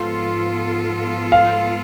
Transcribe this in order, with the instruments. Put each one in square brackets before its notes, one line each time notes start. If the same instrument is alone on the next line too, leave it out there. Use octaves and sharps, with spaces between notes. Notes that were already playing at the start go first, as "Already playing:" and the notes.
Already playing: [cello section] G#2 F3 B3 F4 A4 [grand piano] C6
[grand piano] F5